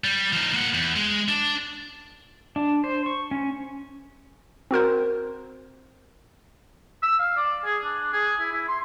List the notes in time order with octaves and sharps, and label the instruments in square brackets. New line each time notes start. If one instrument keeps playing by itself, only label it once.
[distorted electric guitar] G3
F3 D#4
A#3 F#5
E2
G#3
D4
[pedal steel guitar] D4
C5
C#6
C#4
[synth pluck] C4 F#4 A#4 C5
[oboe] E6
F5
D5
G#4
D4
G#4
E4
E4
C6